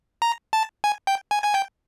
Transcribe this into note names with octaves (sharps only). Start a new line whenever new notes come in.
A#5
A5
G#5
G5
G#5
G#5
G5